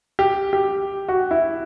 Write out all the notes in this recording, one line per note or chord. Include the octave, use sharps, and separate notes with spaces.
G4
G4
F#4
E4